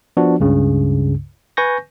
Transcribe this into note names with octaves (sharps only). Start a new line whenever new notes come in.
F3 B3 D4 F#4
C#2 G2 C#3
B4 G#5 C#6 G6 A#6